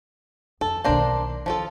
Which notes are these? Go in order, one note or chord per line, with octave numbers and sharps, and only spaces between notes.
F2 A4
B1 D#3 A#3 D4 C5
D#3 F3 F4 A4